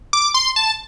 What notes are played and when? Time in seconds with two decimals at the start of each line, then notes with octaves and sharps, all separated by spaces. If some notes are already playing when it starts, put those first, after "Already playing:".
0.13 D6
0.34 C6
0.56 A5